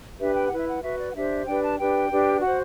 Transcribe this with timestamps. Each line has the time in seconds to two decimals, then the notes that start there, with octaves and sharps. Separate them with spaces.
0.19 D4 G4 B4 E5
0.35 G5
0.46 F#5
0.52 E4 B4
0.58 E5
0.68 F#5
0.82 F#4 B4 E5
0.98 D5
1.11 F#5
1.14 D4 G4 C5 E5
1.46 D4 G4 B4 G5
1.63 A5
1.78 D4 G4 B4 G5
2.10 D4 G4 B4
2.41 F#4 C5 F#5